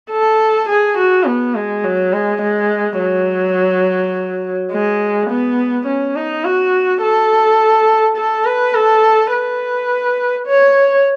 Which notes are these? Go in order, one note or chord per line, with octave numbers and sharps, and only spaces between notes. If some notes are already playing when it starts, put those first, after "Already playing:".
A4
G#4
F#4
B3
G#3
F#3
G#3
G#3
F#3
G#3
B3
C#4
D#4
F#4
A4
A4
B4
A4
B4
C#5